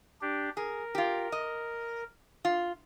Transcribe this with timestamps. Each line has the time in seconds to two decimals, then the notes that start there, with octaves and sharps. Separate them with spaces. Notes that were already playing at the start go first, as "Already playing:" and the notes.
0.21 D4 G4
0.57 G#4 A#4
0.95 F4 G4
1.32 D#5
2.45 F4